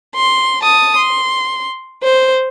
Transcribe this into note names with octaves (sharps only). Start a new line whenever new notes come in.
C6
A5 D#6
C6
C5